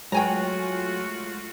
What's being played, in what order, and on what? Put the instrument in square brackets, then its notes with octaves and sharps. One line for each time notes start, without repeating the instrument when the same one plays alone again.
[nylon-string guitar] F#3 [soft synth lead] G#3 [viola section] A3 F4 F#4 [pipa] G5 G#5 A#5